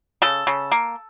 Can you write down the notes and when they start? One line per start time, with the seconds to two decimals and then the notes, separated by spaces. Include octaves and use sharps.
0.22 C#3 A4
0.47 C#3
0.72 A#3